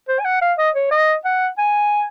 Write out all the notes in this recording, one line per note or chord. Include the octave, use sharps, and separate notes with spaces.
C5
G#5
F#5
F5
D#5
C#5
D#5
F#5
G#5